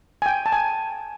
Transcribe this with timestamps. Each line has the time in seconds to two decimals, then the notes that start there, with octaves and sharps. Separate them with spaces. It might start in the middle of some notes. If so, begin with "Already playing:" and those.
0.22 G#5
0.26 G5
0.46 A5
0.52 G#5